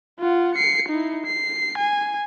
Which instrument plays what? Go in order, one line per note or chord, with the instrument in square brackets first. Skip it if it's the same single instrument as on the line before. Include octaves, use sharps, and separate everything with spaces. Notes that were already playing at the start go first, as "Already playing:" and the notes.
[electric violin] F4 F#5
C7 C#7
D#4 E4
C7
G#5